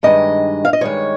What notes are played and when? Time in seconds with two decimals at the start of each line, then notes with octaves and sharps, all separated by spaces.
0.03 G2 D#3 G#3 D#5
0.65 F5
0.73 D#5
0.81 G2 D#3 G#3 C#5